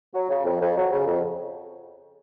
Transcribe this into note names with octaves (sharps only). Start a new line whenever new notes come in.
F#3
C#3
F2
F2
F#3
C#3
F2